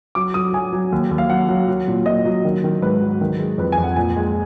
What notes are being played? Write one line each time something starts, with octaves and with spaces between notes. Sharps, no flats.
F#3 D6
F#3 D#6
F#3 G#5
F#3
D#2
D#2
F5
F#3 F#5
F#3
F#3
A#2
A#2 D#5
F#3
D#3
D#3
G#2 B4
F#3
D#3
G#3
F2 B4
G#5
F2
F#5
A#2 G#5
G#3